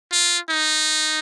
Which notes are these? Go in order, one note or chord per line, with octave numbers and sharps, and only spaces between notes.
F4
D#4